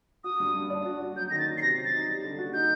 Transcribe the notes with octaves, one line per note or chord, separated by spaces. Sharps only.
F#4 D#6
G2
G2
D4
F#4
F#4
F#3 G6
D#3 A#6
A6
F#3
C7
C3 A#6
F#3
A6
D#4
G3
D3
F#4
D#4 G6